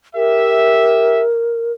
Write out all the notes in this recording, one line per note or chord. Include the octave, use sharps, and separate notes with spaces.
G4 A#4 E5